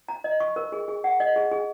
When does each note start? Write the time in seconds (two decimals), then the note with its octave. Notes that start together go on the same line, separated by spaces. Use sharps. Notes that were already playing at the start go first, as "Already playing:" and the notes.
0.09 A#5
0.24 D#5
0.40 C#6
0.56 A#4
0.72 G#4
0.88 G#4
1.04 F#5
1.20 D#5
1.36 G#4
1.52 G#4